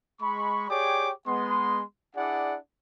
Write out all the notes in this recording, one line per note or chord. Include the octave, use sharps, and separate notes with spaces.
G#3 B5 C#6
G4 G#4 C#5 D5 G5 D6
G#3 B3 C6
D4 E4 G#4 D5 F#5